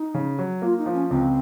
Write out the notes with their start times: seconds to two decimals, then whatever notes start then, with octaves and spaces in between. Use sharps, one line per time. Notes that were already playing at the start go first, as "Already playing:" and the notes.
Already playing: D#4
0.14 C#3
0.38 F#3
0.62 A#3 F4
0.78 D#4
0.86 F3
0.94 C#4
1.09 C#2 C4